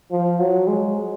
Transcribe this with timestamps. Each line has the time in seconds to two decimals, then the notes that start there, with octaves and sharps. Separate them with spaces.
0.11 F3
0.39 F#3
0.67 G#3